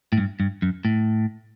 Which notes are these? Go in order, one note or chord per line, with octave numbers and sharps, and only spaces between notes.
A2
G2
G2
F#2
A2